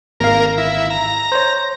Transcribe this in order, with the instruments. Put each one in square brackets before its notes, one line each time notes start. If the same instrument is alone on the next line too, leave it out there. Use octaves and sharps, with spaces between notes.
[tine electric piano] G#1 F5 [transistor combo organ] A#3 A#4
[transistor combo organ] E4
A#5
[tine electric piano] C5 C#5